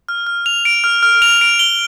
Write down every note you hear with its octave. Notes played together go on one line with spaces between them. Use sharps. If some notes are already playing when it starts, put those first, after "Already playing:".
F6
F6
F7
D7
F6
F6
F7
D7
G7